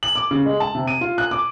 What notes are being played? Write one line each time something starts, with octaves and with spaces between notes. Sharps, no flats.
F#7
D6
C#3
G#3
A5
C3
D#7
F4
F#6
D6